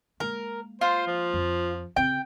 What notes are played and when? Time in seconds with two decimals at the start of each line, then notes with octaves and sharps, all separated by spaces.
0.20 G#3 A#3 A#4
0.81 F4 C5
1.07 F3
1.33 F2
1.96 C#3 C4 G5